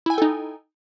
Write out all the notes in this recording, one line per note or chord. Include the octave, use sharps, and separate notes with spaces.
D#4 E4 A4 G5 G#5